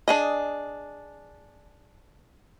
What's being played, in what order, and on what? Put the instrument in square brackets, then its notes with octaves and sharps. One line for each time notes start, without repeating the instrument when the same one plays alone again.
[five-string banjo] D4 G#4 D#5